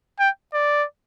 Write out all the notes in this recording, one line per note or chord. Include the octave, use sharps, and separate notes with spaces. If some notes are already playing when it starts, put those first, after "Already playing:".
G5
D5